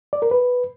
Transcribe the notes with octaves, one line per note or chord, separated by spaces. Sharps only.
D5
A#4
B4